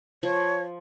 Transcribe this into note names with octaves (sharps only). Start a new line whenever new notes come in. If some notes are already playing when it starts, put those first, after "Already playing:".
F3 C#5